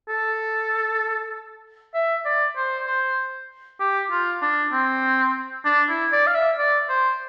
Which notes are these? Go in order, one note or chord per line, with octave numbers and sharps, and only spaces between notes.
A4
E5
D5
C5
C5
G4
F4
D4
C4
D4
E4
D5
F5
E5
D5
C5